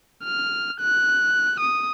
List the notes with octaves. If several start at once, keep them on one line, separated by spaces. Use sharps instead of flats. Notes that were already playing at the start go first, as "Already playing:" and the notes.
F6
F#6
D#6